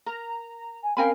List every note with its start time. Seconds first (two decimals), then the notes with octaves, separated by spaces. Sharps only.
0.06 A#4 A#5
0.83 G#5
0.97 C4 C#4 A#4 F5 G5 G#5 B5